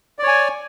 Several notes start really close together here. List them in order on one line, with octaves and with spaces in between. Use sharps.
D5 C#5 G#5